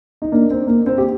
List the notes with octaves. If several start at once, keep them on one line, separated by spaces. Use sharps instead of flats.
D#4
A#3 D4
C4
A#3
C4
G4